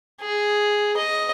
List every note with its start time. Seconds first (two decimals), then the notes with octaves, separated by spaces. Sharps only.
0.21 G#4
0.97 D#5